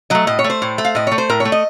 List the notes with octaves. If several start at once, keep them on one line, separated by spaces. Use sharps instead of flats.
F#3 A3 D#5
A2 D#5
C#5
A3
C5
A2
A3
F5
A2 D#5
A3 C#5
C5
A2 A#4
C#5
A3
D#5